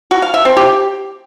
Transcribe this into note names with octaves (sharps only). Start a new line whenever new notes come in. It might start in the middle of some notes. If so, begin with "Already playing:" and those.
F#4
F5
E5
C4
G4